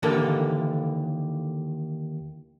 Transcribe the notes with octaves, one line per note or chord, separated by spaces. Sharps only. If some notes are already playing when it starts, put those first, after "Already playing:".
D#2 D3 E3 A#3 A4